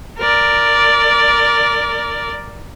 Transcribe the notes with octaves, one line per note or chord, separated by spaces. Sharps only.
A#4 D5